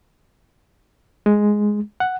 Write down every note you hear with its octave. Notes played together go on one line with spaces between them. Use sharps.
G#3
F#5